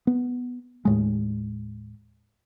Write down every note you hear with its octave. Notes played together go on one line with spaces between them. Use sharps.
B3
D#2 A2 G#3